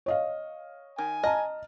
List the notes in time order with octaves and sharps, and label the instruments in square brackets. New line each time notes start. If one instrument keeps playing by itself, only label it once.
[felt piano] C#5 D#5 F5
[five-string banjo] D#3 [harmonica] G#5
[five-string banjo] D#5 [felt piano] A5 A#5 F6